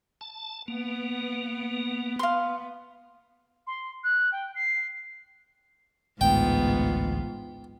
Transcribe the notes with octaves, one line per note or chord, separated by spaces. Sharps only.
A5
A#3 B3
F5 C6
C6
F#6
G5
C7
A1 D2 G#2 G#3 B3 F4 G5